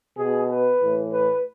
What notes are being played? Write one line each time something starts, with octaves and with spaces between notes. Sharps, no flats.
B2 G#4
B4
A2 E3
B4